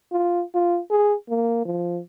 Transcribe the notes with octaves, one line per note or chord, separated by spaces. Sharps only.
F4
F4
G#4
A#3
F3